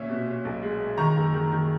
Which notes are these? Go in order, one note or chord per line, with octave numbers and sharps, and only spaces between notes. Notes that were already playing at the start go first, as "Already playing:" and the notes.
Already playing: A#2 C#4 E5
B2
C#4
B1
G#3
G#3
D#3 A#5 C#6
F#1
D#3
D#3